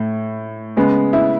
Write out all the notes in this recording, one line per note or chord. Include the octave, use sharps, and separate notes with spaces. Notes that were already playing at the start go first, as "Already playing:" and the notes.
Already playing: A2
C#3 G#3 B3
E4